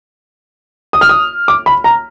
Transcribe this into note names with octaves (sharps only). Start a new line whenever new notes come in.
D#6
F6
D#6
D6
B5
A#5